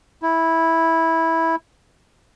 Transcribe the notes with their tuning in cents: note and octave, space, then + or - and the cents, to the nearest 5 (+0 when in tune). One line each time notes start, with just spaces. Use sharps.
E4 -10